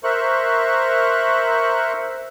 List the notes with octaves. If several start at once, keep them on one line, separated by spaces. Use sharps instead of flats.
A#4 C5 E5 C#6 F#6